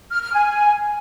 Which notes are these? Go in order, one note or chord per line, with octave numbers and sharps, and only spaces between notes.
F6
F6
G#5